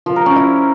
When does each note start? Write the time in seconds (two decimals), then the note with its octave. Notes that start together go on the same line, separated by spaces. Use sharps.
0.06 F3
0.16 A#4
0.26 C#4
0.36 E4